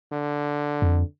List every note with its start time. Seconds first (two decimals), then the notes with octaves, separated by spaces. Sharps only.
0.12 D3
0.82 F2